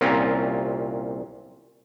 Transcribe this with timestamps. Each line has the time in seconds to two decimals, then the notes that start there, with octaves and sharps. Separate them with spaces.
0.01 C2 A#2 C4 C#4 F4 A#5